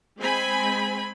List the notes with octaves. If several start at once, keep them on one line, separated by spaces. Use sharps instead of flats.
G#3 C4 G#5 B5